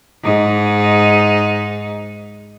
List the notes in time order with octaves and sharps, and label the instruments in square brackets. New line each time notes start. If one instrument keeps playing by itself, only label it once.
[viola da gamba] G#2 D#4